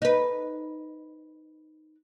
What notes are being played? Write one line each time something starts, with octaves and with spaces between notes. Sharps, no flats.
D#4 B4